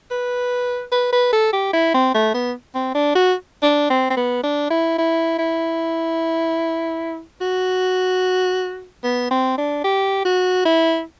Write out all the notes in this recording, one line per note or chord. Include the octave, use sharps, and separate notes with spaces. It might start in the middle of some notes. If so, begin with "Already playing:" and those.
B4
B4
B4
A4
G4
E4
C4
A3
B3
C4
D4
F#4
D4
C4
C4
B3
D4
E4
E4
E4
F#4
B3
C4
D4
G4
F#4
E4